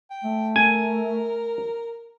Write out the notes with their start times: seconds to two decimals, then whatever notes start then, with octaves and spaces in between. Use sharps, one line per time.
0.11 G5
0.24 A3
0.56 A#4 G#5